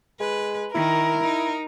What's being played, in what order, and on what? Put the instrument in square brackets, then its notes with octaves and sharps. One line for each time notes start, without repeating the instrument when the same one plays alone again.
[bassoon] G#3 [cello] B4
[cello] D#3 [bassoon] E4 [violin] A#4
[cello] D#4